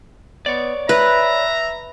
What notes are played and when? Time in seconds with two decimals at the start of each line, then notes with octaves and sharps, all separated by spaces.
0.46 B3 C#5 D5
0.89 B4 E5 A#5